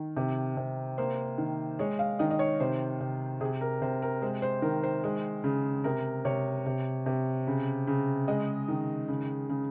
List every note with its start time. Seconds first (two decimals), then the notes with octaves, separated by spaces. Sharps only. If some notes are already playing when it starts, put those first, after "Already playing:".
Already playing: D#3
0.17 C3
0.57 C3
0.98 A#3 C5
1.38 D#3
1.79 G#3 C#5
1.99 F5
2.19 D#3 D#5
2.31 D#5
2.39 C#5
2.60 C3 C5
3.00 C3
3.41 C3 G#4
3.61 A#4
3.82 C3 C5
4.02 A#4
4.22 G#3 C5
4.42 C5
4.62 D#3 A#4
4.83 C5
5.04 G#3
5.44 C#3
5.84 C3 A#4
6.25 C3 C#5
6.66 C3
7.06 C3
7.47 C#3
7.87 C#3
8.28 G#3 D#5
8.68 D#3
9.09 C#3
9.49 C#3